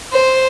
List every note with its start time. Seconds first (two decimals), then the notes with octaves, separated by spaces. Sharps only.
0.13 C5